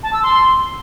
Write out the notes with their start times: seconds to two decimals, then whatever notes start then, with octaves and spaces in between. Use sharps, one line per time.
0.03 A5
0.13 E6
0.23 C6